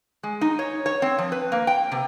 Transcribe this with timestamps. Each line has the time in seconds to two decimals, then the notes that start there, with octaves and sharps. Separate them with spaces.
0.23 G#3
0.41 D#4
0.59 C#5
0.86 C#5
1.02 C4
1.19 F3
1.32 B4
1.52 A#3
1.67 G5
1.92 C3